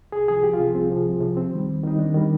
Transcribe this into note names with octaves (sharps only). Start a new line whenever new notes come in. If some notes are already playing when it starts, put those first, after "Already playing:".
C2 G#4
C3 F3 G#4
C2 G4
F4
C3 F3
C2 C4
C3 F3
C2
C3 F3
D#2 C4
D#3 G3
D#2
D#3 G3 D#4
D#2 D4
D#3 G3